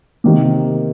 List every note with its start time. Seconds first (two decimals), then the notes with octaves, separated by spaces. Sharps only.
0.24 C3 D#3 A#3